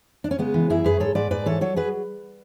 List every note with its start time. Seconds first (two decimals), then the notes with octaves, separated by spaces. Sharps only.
0.24 D4
0.31 C#4
0.39 C#3 G#3 B3
0.54 E3
0.70 F#2 E4 G#4
0.84 F#2 G#4 B4
1.00 G#2 A4 C#5
1.15 G#2 B4 D5
1.31 G#2 B4 D5
1.46 E3 A4 C#5
1.61 F#3 A4 C#5
1.76 F#3 G#4 B4